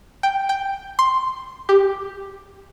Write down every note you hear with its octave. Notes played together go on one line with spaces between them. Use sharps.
G5
G5
C6
G4